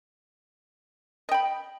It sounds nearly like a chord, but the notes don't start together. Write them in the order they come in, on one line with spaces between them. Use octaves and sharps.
D#5 G5 B5